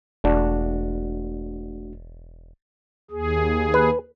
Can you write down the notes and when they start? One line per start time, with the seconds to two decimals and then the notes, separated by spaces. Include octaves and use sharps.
0.24 E1 A3 D4 F#4
3.11 D#2 G#4
3.74 B4